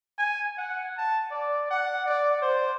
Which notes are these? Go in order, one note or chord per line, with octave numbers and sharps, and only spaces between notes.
G#5
F#5
A5
D5
F#5
D5
C5